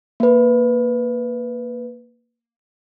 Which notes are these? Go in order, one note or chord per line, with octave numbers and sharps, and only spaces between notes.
A#3 B4